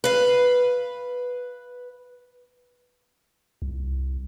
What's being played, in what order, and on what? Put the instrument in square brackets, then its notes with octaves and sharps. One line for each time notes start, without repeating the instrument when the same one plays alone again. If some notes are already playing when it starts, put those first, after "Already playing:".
[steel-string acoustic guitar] B4 F5
[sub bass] C2